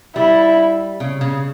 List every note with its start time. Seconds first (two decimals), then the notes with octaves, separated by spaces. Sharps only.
0.16 G3 E4
1.00 C#3
1.21 C#3